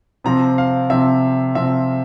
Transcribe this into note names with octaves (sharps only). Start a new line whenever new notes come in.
C3 F3 C4 A#5
F5
C3 F3 C4 E5
C3 F3 C4 E5